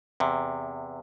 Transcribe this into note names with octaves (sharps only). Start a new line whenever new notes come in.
E2 C3